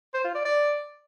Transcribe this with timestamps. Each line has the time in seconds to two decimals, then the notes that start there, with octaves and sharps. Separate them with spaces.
0.14 C5
0.24 F4
0.35 D5
0.45 D5